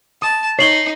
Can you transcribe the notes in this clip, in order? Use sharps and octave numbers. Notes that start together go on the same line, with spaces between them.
A5 D#6
D#4 C#5 C7 F#7 G7